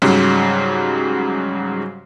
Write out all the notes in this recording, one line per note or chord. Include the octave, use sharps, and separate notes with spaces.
G#2 C#3 F#3 G3